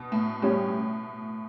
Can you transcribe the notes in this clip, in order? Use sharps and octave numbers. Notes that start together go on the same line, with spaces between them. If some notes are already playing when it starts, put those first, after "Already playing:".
Already playing: B2
A2
A2 G3 C#4 G4 C#5